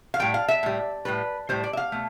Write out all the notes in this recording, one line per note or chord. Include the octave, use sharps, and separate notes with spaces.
F5
A2 G3 G5
F5
E5
A2 G3
A2 G3 B4
A2 G3 C5
D5
E5
F5
B2 A3